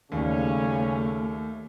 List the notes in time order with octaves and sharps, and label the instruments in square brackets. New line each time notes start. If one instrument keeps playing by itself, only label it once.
[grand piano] D#2 [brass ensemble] C#3 G3 C#4 [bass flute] A3